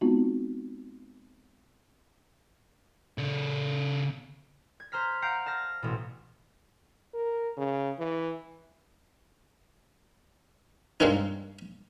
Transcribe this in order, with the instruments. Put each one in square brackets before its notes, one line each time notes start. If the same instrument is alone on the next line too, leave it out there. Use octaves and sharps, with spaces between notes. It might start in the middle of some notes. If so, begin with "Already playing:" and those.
[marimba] G#3 B3 C4 D#4 F4 F#4
[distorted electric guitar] C#3 A4
[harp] G#6
C5 A#5 F6 B6
F5 F#5 A#5 G6 C7 D7
A5 F6 A#6
A1 B2
[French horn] A#4
C#3
E3
[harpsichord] G2 G#3 A#3 C4 C#4 D#4